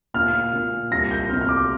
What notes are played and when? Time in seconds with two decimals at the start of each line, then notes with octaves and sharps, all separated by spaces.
0.14 A#2 F6
0.53 A#2
0.91 C2 A#6
1.11 G6
1.30 C3 F6
1.41 F6
1.49 D6